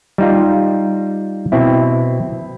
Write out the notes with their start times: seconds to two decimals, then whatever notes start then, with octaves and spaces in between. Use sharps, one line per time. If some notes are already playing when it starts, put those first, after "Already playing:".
0.18 G3 D#4 F4
1.52 B2 C4 E4